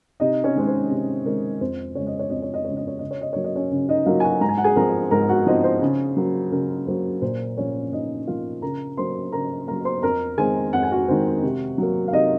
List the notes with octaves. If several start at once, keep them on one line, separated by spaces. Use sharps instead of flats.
C3 D#4 D#5
C#4 C#5
D#3 G#3 C4
C5
C3
D#3 G#3 C4 A#4
F2 C5
C#3 G#3 C#5
D#5
C#5
F2 D#5
C#5
D#5
C#3 G#3 C#5
D#5
C#5
C#3 D#5
C#5
D#5
F#3 A#3 C#5
D#5
C#4 C#5
C#3
D#4 D#5
F#3 A#3 F4 F5
G#5
F#4 F#5
G#2 A#5
G#5
F#5
G#4 G#5
F3 C4 A#4 A#5
G#2 A#4 A#5
F#4 F#5
F3 C4 D#4 D#5
C5
C#3
F#3 A#3
C#3 A#4
F#3 A#3 C5
A#2 C5
F3 A#3 C#4 C#5
A#2 D#4 D#5
F3 A#3 F4 F5
C#3 A#4 A#5
F#3 A#3 C5 C6
C#3 A#4 A#5
F#3 A#3 A#4 A#5
C5 C6
F2 A#4 A#5
D#3 G#3 C4 G#4 G#5
F2 F#5
G#5
F#4 F#5
D#3 G#3 C4
C3
F#3 A#3
F5
C3 D#4 D#5